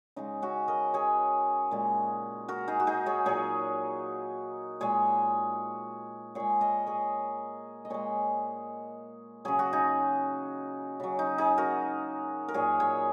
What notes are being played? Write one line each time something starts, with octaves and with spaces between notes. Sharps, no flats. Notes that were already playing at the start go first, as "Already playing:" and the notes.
C#3 G#3 D#4
C#4 F#4
A#4 D#5
G#4 C#5
A#2 G#3
F#4 A#4
D#4 G#4
F#4
D#4 G#4
G#4 C#5
A#2 F#3 G#4 C#5
A#2 G#3 G#4 C#5
A#2 G#3 G#4 C#5
A#4 D#5
G#4 C#5
D#5
A#2 G#3 G#4 C#5
C#3 F#3 G#4
F#4
D#4 G#4
C#3 F#3
D#4
D#4 G#4
F#4 A#4
A#4
A#2 F#3 G#4 C#5
G#4 C#5